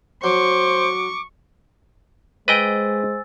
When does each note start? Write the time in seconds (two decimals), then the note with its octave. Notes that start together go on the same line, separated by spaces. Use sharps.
0.24 F#3 C5 C#6 D6
2.48 G#3 B4 C5 D#5 G5 G#5 E6 A6